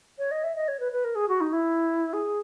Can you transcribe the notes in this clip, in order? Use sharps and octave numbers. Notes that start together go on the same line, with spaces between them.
C#5
D#5
E5
D#5
C#5
B4
B4
A#4
G#4
F#4
D#4
E4
G#4